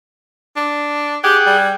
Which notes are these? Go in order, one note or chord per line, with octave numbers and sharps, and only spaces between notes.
D4
G4 G#4 F#5 G5
G3